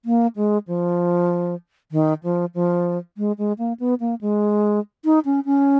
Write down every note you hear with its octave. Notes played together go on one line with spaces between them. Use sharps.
A#3
G#3
F3
D#3
F3
F3
G#3
G#3
A#3
B3
A#3
G#3
D#4
C#4
C#4